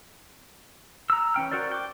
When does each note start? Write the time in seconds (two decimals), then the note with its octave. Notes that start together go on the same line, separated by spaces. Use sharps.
1.10 A#5 E6
1.34 E3 C#4 G5 F6
1.51 F#4 A#4 C5 D5
1.71 G5 D6